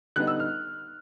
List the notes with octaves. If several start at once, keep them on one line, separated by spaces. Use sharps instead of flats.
D3 G3 B3 D#4 F#6
E6
F6